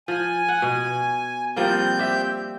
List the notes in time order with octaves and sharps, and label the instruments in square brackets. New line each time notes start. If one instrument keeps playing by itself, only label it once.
[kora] F3 [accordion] G#5
[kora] F#5
B2
[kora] F3 G3 A#3 [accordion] C4 G6
[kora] G4 E5